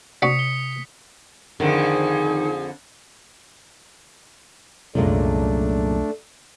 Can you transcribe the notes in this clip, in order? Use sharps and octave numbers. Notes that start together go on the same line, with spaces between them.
C3 D4 F#4 D#6 B6 C#7
G7
F2 D3 D#3 G#4
C2 F#2 A#2 G#3 A3 D4